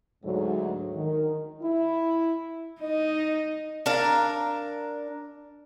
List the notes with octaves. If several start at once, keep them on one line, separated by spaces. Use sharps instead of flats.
D2 G#2 F#3
D#3
E4
D#4 D#5
D4 A#4 F5